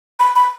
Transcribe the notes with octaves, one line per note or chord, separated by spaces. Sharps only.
B5
B5